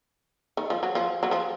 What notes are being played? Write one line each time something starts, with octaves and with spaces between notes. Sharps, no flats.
D#3
F3
F#3
F3
F#3
F3